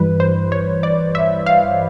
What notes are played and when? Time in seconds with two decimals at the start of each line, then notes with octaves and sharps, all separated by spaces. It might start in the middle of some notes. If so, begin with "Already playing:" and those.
Already playing: G2 E3 G3 B4
0.20 C5
0.52 C#5
0.83 D5
1.15 E5
1.46 F5